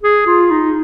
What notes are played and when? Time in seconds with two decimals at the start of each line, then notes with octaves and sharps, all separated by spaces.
0.03 G#4
0.27 F4
0.51 D#4